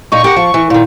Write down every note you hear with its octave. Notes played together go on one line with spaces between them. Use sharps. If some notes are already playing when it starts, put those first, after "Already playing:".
A#2 D#4 C#6
G4 A#4 F#5
F3
E3
A#2 D#3